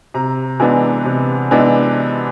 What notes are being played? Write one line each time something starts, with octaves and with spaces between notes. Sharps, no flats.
C3 A#5
E3 G#3 B3 D4
C3
E3 G#3 B3 D4